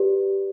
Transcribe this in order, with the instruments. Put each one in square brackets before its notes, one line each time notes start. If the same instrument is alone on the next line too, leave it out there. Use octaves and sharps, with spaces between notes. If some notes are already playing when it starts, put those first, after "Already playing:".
Already playing: [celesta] G4 B4 D5